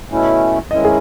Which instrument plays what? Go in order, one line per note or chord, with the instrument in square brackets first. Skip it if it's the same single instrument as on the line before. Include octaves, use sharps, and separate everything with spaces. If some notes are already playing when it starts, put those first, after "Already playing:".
[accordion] B2 A3 C#4 E4
[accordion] G#2 D#3 G#3 C#4 E4 [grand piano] D#5
[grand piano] G#4